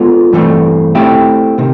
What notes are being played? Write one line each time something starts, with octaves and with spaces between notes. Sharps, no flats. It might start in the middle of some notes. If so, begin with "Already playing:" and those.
Already playing: G#3 B3 D4 F4 A4
G2 E3 A3 C4
A3 C4 E4 G4
C3 D#3